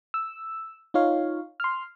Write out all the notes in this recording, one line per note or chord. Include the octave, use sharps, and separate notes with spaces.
E6
D#4 F4 C#5 F5
C6 F6